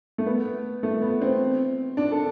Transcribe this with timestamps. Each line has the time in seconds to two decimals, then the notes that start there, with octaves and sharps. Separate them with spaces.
0.18 A3
0.26 B3
0.83 A3
1.02 B3
1.22 C4
1.97 D4
2.12 A4